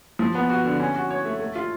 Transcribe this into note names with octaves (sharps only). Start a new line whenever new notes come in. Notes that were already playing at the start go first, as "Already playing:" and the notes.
F3
B3
F#4
D3
C#4
F#4
C#5
A3
A3
F4